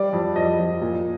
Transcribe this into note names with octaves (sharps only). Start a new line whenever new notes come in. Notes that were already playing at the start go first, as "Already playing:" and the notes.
Already playing: G3 D5
F2
F2 D#5
F2
A#2